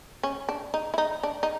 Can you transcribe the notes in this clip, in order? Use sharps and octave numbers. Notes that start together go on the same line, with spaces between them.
C#4
D4
D#4
E4
D#4
D4
D#4